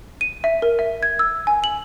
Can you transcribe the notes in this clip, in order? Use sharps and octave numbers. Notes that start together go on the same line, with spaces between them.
D#7
E5
A#4
E5
G#6
E6
G#5
F#7